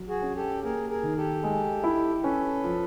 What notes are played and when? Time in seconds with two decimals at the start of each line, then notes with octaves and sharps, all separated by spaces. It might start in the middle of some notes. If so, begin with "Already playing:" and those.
Already playing: F#3
0.08 F#4 G#4
0.22 C#4
0.35 G4 A4
0.63 A#3 G#4 A#4
0.89 G#4 A#4
1.03 D#3
1.16 G4 A4
1.44 G#3
1.84 E4
2.23 C#4 A4 B4
2.64 F3